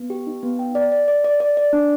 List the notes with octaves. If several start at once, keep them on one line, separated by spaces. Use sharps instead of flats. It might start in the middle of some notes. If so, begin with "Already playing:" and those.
Already playing: B3
G4
D#4
B3
G5
D5
D5
D5
D5
D5
D5
D4